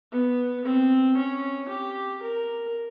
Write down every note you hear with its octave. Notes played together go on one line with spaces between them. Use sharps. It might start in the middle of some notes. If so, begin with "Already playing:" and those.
B3
C4
C#4
G4
A#4